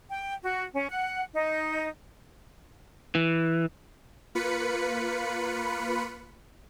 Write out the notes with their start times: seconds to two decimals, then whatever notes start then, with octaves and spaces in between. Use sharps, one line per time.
0.10 G5
0.43 F#4
0.73 C#4
0.90 F#5
1.34 D#4
3.15 E3
4.35 A#3 F4 B4 B5 C#7